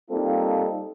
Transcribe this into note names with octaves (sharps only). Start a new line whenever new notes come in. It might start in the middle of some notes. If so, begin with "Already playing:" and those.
G3 A#3 C4 D#4 F4 A4